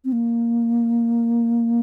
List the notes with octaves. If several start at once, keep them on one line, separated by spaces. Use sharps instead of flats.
C4
A#3